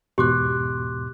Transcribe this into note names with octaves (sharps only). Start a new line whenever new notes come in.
E2 G#2 B2 G4 C6 D6 F#6